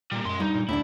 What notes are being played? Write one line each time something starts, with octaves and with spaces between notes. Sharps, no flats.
A#2 G3 A#3
F#2 G#3 C6
G2 D#4
A#2
D#2 A2 D3 D4 E4